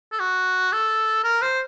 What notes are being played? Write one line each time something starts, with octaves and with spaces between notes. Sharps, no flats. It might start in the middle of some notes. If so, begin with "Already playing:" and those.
A4
F#4
A4
A#4
C5